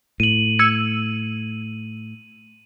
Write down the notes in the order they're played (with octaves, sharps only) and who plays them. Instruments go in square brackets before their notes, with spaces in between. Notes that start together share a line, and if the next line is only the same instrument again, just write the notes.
[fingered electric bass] A2 [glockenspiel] D#7 F#7
[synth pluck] E6 G#6 C#7